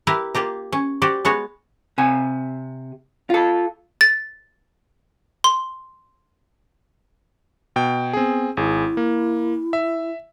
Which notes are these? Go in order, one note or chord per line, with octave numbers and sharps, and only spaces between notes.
E4 G4 A#4 B4
A#3 F4 G4 A#5
C#4
F#4 G4 C5 D5
G#3 B3 F#4 C#5
C3 G#5
F4 A4
A6
C6
B2 G5
B3 C4 G#4
G#1 E4 G#4
A#3
E5